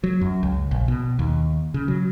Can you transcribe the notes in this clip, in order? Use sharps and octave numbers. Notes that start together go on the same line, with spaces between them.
F#3
F#2
C#2
A#1
B2
D#2
C#3
F#3